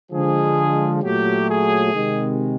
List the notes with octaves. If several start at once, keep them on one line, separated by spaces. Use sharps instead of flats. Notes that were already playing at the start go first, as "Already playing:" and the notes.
D3 F3 G#3 G#4
A#2 F#3 A3 G4
G#4
C3 D#3 G#3